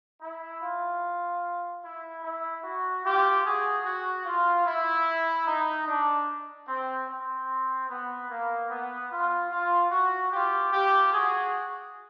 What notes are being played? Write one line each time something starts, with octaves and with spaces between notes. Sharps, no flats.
E4
F4
E4
E4
F#4
F4 G4
F#4 G#4
F#4
F4
E4
D#4
D4
C4
C4
B3
A#3
B3
F4
F4
F#4
F4 G4
F4 G4
F#4 G#4